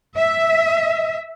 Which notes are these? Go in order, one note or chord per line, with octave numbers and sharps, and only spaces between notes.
E5